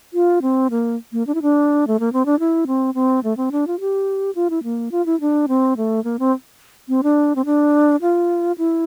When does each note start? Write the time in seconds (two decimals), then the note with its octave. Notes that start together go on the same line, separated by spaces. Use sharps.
0.14 F4
0.42 C4
0.71 A#3
1.13 A#3
1.27 D4
1.35 E4
1.42 D4
1.87 A3
2.00 A#3
2.13 C4
2.26 D4
2.39 E4
2.67 C4
2.95 C4
3.24 A3
3.37 C4
3.52 D4
3.67 F4
3.80 G4
4.35 F4
4.50 E4
4.63 A#3
4.92 F4
5.06 E4
5.21 D4
5.48 C4
5.77 A3
6.04 A#3
6.19 C4
6.88 C4
7.03 D4
7.36 C4
7.46 D4
8.02 F4
8.58 E4